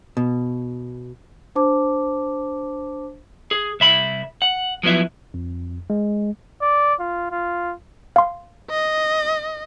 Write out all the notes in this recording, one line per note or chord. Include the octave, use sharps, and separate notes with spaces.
B2
D4 C5 A5 D6
G#4
C2 E5 B5
F#5
F3 F#3 B3 E4 E5
F2
G#3
D5
F4
F4
F5 C6
D#5